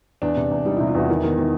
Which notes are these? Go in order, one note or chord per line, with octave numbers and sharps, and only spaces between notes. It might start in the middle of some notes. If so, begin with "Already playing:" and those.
E2 D4
C3
E2
G3 D#4
C3 E4
F4
E2 F#4
D#3 E4
D#3 B3
D#3 B3